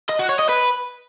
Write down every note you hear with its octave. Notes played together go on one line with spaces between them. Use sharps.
D#5
F#4
C#5
D#5
B4